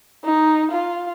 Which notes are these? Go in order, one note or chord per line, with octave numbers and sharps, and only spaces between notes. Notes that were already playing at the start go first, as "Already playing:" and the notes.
D#4
F4